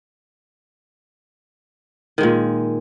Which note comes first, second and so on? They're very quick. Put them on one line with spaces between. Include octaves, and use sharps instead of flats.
D#3 G#3 A#2